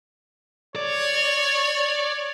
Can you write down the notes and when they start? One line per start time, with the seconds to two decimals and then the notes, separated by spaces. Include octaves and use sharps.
0.76 C#5 D5